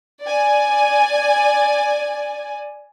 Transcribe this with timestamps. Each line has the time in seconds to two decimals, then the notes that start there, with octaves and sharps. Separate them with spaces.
0.24 D5 G#5